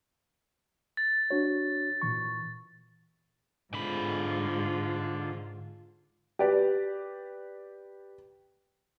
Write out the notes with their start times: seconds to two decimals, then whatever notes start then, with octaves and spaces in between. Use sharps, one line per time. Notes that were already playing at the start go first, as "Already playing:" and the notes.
0.97 A6
1.31 D4 F#4 C#5
2.02 A#2 E3 C#6
3.74 G#2 D3 F4 B5
6.39 G4 B4 D5